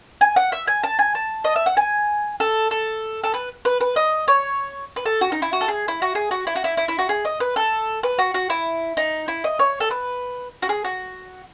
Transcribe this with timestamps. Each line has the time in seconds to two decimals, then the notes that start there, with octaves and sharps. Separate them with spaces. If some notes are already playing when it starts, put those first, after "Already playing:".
0.21 G#5
0.36 F#5
0.52 E5
0.67 G#5
0.83 A5
0.99 G#5
1.15 A5
1.44 D#5
1.56 E5
1.66 F#5
1.77 G#5
2.40 A4
2.71 A4
3.23 A4
3.34 B4
3.65 B4
3.81 B4
3.96 D#5
4.28 C#5
4.96 B4
5.06 A4
5.21 F#4
5.32 D#4
5.42 E4
5.53 F#4
5.61 A4
5.68 G#4
5.88 E4
6.02 F#4
6.15 G#4
6.31 F#4
6.47 E4
6.56 F#4
6.64 E4
6.77 E4
6.88 E4
6.98 F#4
7.09 G#4
7.25 D#5
7.40 B4
7.56 A4
8.03 B4
8.19 F#4
8.34 F#4
8.50 E4
8.97 D#4
9.28 E4
9.44 D#5
9.59 C#5
9.80 A4
9.91 B4
10.62 F#4
10.69 G#4
10.84 F#4